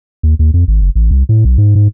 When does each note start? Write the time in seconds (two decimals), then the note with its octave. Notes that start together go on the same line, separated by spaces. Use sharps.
0.23 D#2
0.39 D#2
0.54 F2
0.68 G#1
0.81 F#1
0.95 A1
1.11 C2
1.29 A2
1.45 B1
1.58 G#2
1.75 G#2